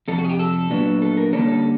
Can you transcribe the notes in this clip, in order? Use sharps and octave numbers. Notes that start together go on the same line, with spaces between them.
F2 C3 A4
F#4
G#4
G4
A4
A#2 F#3 B3 D4
A4
A#4
D3 G3 A#3 C#4 A4
A4